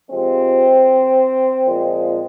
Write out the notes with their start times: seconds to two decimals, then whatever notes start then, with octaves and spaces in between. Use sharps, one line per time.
0.10 C3 F3 G#3 C4
1.66 A#2 F3 G#3 C4